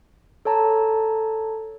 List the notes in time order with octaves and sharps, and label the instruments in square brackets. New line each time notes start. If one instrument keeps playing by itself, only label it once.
[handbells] A4 C#5 A5 A#5